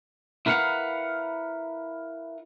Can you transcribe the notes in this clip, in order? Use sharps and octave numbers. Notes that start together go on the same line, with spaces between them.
E4 A#4 B4 F5 F#5